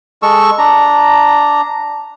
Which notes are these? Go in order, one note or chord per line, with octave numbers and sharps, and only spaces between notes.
G#3 A4 C#6 E6
D4 A#5